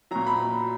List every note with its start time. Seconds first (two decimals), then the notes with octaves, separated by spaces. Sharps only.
0.11 A#2 F#3 A#5
0.27 B5